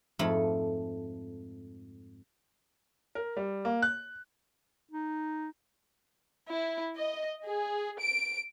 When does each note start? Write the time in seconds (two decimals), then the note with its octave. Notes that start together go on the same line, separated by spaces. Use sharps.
0.19 F2 G#2 A3 B5
3.15 A#4
3.37 G3
3.65 A#3
3.82 F#6
4.91 D#4
6.50 E4
6.98 D#5
7.45 G#4
8.00 D7